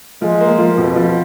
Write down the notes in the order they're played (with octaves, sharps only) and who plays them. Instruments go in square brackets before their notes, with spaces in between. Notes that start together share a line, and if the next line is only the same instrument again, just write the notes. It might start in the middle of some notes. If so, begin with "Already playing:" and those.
[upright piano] F3 [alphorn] G#3
[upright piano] A#3
F3
[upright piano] F2 [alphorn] B2
[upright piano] F3